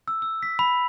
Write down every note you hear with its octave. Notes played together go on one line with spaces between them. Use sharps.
E6
E6
B6
B5